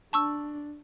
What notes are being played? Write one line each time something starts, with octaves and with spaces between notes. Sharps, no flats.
D4 A5 C#6 E6